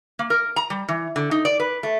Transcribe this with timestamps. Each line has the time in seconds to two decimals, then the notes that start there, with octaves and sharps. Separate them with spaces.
0.19 A#3
0.30 A#4
0.56 A#5
0.70 G3
0.88 E3
1.16 D3
1.31 D#4
1.45 D5
1.60 B4
1.83 A3